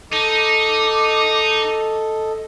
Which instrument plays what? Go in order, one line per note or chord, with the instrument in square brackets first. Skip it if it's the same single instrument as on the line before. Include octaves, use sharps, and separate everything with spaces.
[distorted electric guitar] D#4 [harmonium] A4 D#5 [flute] D6